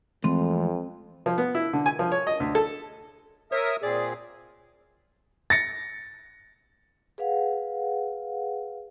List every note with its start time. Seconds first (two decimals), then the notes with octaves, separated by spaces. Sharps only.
0.24 F2 E3 G#3 A3 C4
1.26 F3
1.38 B3
1.55 E4
1.73 D3
1.86 G#5
1.99 F3
2.12 C#5
2.27 D#5
2.40 D2
2.55 A4
3.52 A#4 C#5 E5 D#6
3.83 A#2 C4 G#4 D5
5.50 A6 A#6 C#7
7.18 G#4 B4 F5 F#5